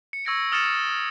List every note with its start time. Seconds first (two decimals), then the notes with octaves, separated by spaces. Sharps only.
0.13 C#7
0.25 C#6 E6 G#6 A#6 C#7 D7
0.52 D#6 F6 A6 C#7 E7
0.91 F6